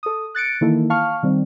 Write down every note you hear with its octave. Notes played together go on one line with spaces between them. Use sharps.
A4 D#6
F#6 A6 C#7 D7
D#3 E3 A#3 E4 A4
F5 A5 C#6 F6
D#3 G3 C4